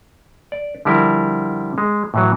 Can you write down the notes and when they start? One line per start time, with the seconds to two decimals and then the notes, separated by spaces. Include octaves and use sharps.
0.52 D5
0.85 D3 F3 G3 E4 A#4
1.78 G#3
2.14 A2 E3 F#3